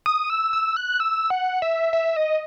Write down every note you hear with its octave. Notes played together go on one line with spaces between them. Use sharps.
D#6
E6
E6
F#6
E6
F#5
E5
E5
D#5